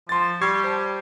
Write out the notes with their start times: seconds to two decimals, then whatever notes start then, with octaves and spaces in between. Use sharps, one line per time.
0.09 F3 C6 A6
0.42 G3 G4 C#6 G#6 C7
0.64 C5 A5